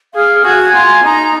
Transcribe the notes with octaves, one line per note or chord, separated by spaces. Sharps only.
G#4 F5
F#4 G#5
F4 G#5
D#4 A#5